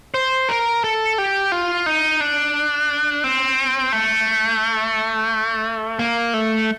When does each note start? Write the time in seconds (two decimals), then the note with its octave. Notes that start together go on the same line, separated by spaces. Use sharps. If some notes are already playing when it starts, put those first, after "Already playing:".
0.14 C5
0.49 A#4
0.84 A4
1.18 G4
1.52 F4
1.86 D#4
2.20 D4
3.24 C4
3.93 A3
5.99 A#3
6.34 A3